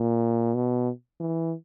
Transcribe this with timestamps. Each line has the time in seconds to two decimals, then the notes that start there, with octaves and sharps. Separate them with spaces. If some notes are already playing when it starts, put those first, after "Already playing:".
Already playing: A#2
0.55 B2
1.20 E3